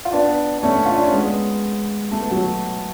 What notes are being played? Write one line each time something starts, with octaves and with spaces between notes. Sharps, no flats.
F4
B3 D4
D4
A3 C#4
F4
D4
C#4
G#3 B3
A3
B3
F#3 A3